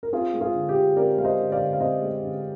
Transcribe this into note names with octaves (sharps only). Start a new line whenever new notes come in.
A#4
C4 F4 G#4
G#3
F4 G#4
D3
G4
D3
C4 A#4 D5
G#3 F5
C5 D#5
D3
D5 F5
D3
F5
C4 C5 D#5
G#3
D3